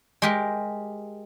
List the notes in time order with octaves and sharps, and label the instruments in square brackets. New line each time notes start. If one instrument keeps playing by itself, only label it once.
[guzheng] G#3 G4 A#4